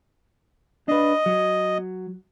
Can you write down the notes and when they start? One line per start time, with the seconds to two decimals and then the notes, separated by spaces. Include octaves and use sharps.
0.88 D4 B4 D#5
1.26 F#3